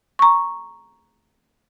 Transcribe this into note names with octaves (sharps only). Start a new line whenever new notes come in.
A#5 C#6